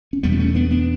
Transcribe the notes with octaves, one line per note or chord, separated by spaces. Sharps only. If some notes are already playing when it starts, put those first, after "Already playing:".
C#4
E2 B2 G3 B3
D4
A3 C#4
B3 D4
B3 D4